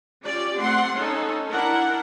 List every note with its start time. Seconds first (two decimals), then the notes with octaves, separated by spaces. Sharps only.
0.24 C#4 F4 G4 D5
0.59 A3 C4 F#5 C6
0.94 C#4 D#4 A4
1.51 D4 E4 A#4 F#5